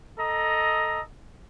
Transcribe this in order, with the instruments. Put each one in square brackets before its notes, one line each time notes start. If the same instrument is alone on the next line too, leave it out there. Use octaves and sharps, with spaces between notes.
[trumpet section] A4 D#5 A#5